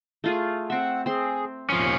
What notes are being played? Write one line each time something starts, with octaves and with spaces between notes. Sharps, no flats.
A3 F4 G#4
C4 E5 F#5
C4 G#4 C6
D#2 A#2 F3 C#4